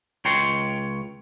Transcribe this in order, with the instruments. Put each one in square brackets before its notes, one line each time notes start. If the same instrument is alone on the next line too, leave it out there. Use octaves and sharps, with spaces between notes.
[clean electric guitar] C#2 C#5 G5 C6